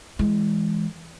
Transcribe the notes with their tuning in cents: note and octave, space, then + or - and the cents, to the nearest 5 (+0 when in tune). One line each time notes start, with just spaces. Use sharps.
E3 +0 G#3 +0